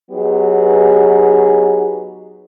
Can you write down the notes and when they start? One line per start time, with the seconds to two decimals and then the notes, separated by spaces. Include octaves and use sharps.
0.11 F#3 B3 D#4 G4 G#4